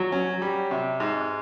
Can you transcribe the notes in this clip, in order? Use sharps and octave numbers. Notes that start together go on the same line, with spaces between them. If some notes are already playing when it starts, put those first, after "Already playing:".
Already playing: F#3
C#4
G3
C3
G#2